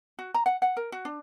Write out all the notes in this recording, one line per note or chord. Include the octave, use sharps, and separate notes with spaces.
F#4
A#5
F#5
F#5
A#4
F#4
D4